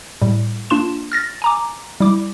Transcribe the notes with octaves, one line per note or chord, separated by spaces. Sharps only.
A2 G3
A#3 D4 F4 C6 E7
F6 A6 A#6
G#5 A#5 D6
G3 E4 D6